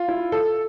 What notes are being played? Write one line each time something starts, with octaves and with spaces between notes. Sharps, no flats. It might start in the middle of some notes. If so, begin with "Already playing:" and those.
Already playing: F4
E4
A4